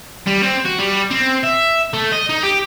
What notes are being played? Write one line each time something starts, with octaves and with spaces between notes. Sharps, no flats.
G3
C4
F#4
G3
C4
E5
A3
D#5
D#4
G4